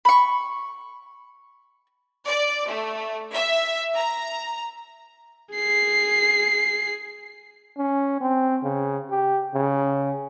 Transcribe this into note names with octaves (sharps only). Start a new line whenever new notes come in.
B5 C#6
D5
A3
E5
A#5
G#4 C7
C#4
C4
C#3
G4
C#3